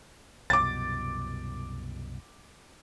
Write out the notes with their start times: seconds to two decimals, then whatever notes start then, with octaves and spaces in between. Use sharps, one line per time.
0.50 C2 F#2 B2 D6 A6